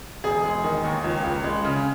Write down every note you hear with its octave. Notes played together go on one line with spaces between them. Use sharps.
E1 G#4
G#3
D#3
D#2
C#2
C#2
G#3
C#3